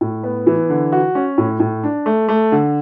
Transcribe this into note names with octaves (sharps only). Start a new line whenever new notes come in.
A2
B3
E3
D3
F#4
C#4
A2
A2
D4
A3
A3
D3